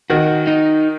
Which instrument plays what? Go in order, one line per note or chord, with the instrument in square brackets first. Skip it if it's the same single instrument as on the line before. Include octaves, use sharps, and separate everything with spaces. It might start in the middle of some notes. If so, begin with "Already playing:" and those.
[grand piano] D#3 [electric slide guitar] F#4
[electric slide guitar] D#4